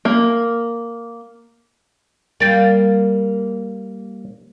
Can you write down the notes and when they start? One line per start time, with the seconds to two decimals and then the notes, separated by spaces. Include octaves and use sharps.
0.05 A#3
2.40 G3 A#3 D5 G5